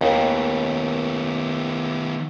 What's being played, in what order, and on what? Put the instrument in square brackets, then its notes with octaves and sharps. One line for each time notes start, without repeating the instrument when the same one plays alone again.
[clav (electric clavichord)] D#2 [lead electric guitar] D#3 B3